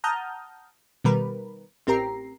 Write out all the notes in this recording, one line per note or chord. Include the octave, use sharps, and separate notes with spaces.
F#5 A5 A#5 D#6 F6 G6
B2 D#3 G3 A#4 B4
A1 C4 G4 A#4 A#5 C7